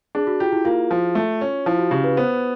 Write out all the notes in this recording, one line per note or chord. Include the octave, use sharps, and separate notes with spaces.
D4 G#4
F#4
F4 G4
E4
A#3 F4
F3
A3
C#4
F3 E4
F#4
C#3 G4
B4
B3 C5